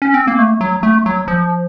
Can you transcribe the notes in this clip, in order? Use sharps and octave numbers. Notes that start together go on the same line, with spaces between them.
C#4
C4
A#3
A3
F#3
A3
F#3
F3